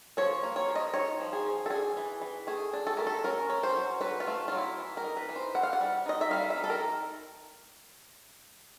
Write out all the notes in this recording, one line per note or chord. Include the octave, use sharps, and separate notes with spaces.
F3 C#5
A#3
C#5
F3
D#5
D#4 C#5
F3
G#4
F3
A4
D4 G#4
E3
E3
A3 G#4
D4
A4
A3 A#4
A4
C#4 A#4
C#4
C5
F#3
F#3 B4
F4
A3
F#3 F4
E4
E3
A#4
D#4
B4
E3
C5
E3 F#5
F5
F#5
G3
D#4 D#5
E5
G3 F5
E5
D#4
A4
A#4